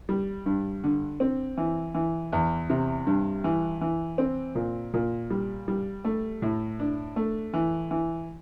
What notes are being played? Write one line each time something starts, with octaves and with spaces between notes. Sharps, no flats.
G3
G2
D3
C4
E3
E3
E2
C3
G2
E3
E3
C4
A#2
A#2
G3
G3
A3
A2
D4
A3
E3
E3